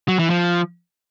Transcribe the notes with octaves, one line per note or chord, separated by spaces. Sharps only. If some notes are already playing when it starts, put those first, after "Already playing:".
F#3
E3
F3